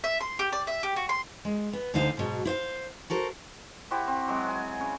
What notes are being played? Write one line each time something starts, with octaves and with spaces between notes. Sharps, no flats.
E5
C6
G4
D5
E5
G4
F#4
C6
G#3
B3
D2 D3 D#4 C5 F5
G#2 B2 F#3
E4 C5 F5
F#4 A4 A#4 C5
E4 F#4 G4 C5
C4
F#3 G#3 C4
G#5
C#3